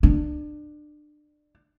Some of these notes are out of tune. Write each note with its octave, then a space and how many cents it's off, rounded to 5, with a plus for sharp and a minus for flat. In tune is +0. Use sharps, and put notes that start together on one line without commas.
D4 +25